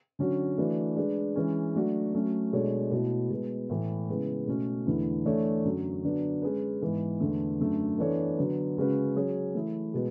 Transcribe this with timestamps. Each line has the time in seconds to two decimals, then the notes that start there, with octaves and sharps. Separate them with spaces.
0.19 D3 F#3 C#4 F#4 C#5
0.58 E3 A3 D4 F#4 B4
0.96 G#3 D4 G#4 B4
1.36 E3 G#3 C#4
1.75 F#3 A3 D4 F#4
2.14 F#3 A3 C#4
2.52 B2 G#3 D4 A4 C#5
2.91 B2 A3 E4
3.30 B2 G#3 B3
3.70 A2 E3 A3
4.09 C#3 G#3 B3 E4
4.47 B2 A3 C#4
4.87 E2 D3 A3 E4
5.25 E3 A3 D4 A4 C#5
5.64 F#2 D3 F#3
6.04 D3 F#3 B3 D4
6.42 G#3 C#4 G#4 B4
6.82 G#2 E3 B3
7.20 E2 D3 A3
7.60 F#2 D3 A3
7.98 E3 B3 D4 A4 C#5
8.37 D3 F#3 B3
8.77 C#3 G#3 C#4 F#4 B4
9.15 F#3 C#4 G#4 C#5
9.54 E3 A3 E4
9.94 B2 G#3 B3